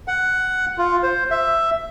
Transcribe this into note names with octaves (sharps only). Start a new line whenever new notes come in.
F#5
F4
C5
E5